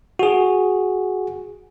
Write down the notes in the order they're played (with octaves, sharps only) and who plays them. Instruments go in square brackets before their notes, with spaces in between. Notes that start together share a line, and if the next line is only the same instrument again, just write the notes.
[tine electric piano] F#4 G#4